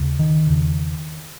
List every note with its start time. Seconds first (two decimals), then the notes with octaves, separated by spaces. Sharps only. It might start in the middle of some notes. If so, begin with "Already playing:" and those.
Already playing: D#2 C#3
0.19 D#3
0.47 E2 C#3